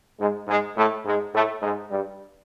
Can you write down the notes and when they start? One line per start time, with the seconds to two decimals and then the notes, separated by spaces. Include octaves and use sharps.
0.19 G#2 G#3
0.47 G#2 G#3
0.76 A2 A3
1.05 G#2 G#3
1.34 A2 A3
1.62 G#2 G#3
1.91 G2 G3